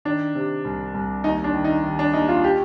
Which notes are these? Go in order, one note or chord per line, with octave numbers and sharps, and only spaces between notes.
D#3 D4
C3
C2
C2
D#2 D#4
D4
D#3
D#4
D#3
D4
D#2 D#4
F4
G4